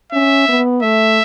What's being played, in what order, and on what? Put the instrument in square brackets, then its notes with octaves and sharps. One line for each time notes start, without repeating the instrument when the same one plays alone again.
[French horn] C#4 [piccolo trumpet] E5
[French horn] B3
[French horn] A3 [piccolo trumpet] E5